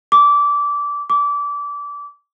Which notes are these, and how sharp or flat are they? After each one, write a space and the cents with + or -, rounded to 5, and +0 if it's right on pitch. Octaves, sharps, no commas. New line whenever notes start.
D6 -20
D6 -25